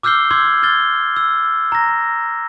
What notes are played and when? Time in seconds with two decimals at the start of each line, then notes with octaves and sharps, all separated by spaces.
0.03 D6 E6 F6 G6 C7 G7
0.31 C6 D6 E6 G#6
0.63 F6 G#6 A6 G7
1.16 E6
1.72 A#5 A#6